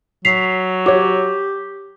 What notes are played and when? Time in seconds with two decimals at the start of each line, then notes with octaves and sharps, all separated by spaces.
0.25 F#3 B6 C7 F7
0.86 F#4 G4 C#5 D6